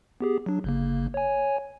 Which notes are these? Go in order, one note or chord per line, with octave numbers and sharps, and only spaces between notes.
B3 G4 G#4
F#3 D4
G1 C#3 A#3
C#5 G#5